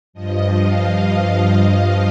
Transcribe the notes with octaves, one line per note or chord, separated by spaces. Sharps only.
G2 F3 D#5
F5
D#5